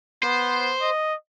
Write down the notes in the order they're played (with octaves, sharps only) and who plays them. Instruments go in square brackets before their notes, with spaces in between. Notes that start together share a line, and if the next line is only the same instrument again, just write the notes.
[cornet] B3 [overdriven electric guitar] C5
[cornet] D#5